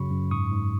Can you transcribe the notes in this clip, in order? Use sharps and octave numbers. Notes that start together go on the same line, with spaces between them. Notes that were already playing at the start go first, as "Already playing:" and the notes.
Already playing: F#2 C#3 F#3 B5 C#6
F#2
G#2 C#6 D#6
G#2